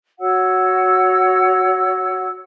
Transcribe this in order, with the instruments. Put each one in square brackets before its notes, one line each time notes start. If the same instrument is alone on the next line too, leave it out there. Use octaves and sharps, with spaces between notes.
[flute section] F#4 C#5 F#5 E6